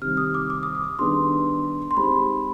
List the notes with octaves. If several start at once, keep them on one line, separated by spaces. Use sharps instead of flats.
C3 D#3 G3 F6
D#6
D6
D6
D#6
D#6
D#3 G3 B3 D4 G#4 C6
C6
G#3 C4 D#4 G4 B5